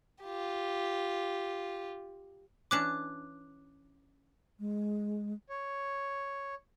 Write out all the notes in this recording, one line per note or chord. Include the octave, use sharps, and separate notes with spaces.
F4 G4
E3 C#4 D4 D6 F#6
G#3
C#5